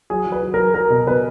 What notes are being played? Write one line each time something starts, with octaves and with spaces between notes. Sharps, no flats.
F#3 G#4
F#3
B4
F#3
A#4
F#3
F#3 A#4
B2
B2 B4